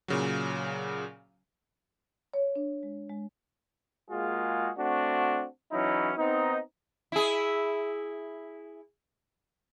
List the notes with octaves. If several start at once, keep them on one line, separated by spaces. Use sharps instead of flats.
A#2 C#3 F#3
C#5
D4
G#3
G#3
G#3 A#3 F4 F#4 G#4
A3 C4 D4 F#4
E3 F#3 C#4 D#4 E4
B3 C4 D#4
E4 G#4